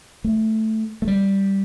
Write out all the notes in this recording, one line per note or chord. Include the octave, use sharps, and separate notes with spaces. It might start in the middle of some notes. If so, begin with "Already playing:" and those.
A3
A3
G3